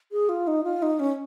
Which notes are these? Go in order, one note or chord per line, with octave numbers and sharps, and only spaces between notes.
G#4
F4
D#4
F4
D#4
C#4